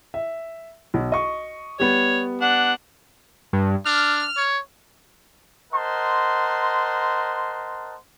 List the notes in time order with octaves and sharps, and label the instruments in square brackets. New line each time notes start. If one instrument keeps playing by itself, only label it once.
[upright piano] E5
B1
D#5 C#6
[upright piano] G3 B3 [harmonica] C#5
[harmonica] D4 F#5
[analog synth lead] G2
[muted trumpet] D4 [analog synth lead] F6
[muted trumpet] C#5
[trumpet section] A#4 C5 D#5 F#5 A5 C6